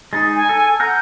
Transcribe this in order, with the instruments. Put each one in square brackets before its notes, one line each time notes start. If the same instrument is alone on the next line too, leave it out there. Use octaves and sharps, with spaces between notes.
[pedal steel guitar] G#3 D#4 [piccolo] A6
[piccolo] G#5
[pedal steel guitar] A4
[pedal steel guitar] F#5 A#5 F6 [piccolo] G6